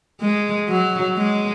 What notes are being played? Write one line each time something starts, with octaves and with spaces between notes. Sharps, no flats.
G#3
F#3
G#3